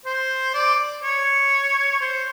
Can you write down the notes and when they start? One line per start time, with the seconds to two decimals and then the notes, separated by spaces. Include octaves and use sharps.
0.06 C5
0.54 D5
1.04 C#5
2.01 C5